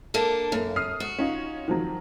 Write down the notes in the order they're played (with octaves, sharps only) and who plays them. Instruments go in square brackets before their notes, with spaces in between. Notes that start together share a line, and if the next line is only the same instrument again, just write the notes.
[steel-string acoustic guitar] A#3 D4 A4
[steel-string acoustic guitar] F#2 [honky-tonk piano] A#3
[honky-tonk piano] D#6 F6 C7
[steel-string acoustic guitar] F#4
[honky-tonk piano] C#4 D#4 F4
D#3 F3 F#3